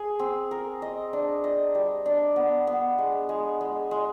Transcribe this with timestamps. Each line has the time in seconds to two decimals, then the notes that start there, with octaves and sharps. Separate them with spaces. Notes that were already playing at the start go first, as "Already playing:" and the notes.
Already playing: G#4
0.19 C4
0.51 A#4
0.82 D#5
1.13 D4
1.44 D#5
1.75 G3
2.06 D4
2.36 B3
2.67 B3
2.98 G#3
3.29 G#3
3.61 G#3
3.91 G#3